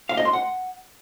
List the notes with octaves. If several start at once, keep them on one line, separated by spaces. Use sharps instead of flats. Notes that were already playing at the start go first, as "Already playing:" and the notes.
F5
D#5
C6
F#5